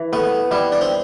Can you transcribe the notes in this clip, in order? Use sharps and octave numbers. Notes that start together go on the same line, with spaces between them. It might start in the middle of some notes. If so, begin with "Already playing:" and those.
Already playing: E3
A3 B3
G3 E4
D4
C4